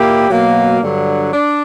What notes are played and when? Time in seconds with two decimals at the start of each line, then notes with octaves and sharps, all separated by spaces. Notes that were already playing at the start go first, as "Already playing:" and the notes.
Already playing: A#2 A#3 E4 G4
0.30 B2 F#3 A#3
0.81 G2 D3 F#3
1.33 D4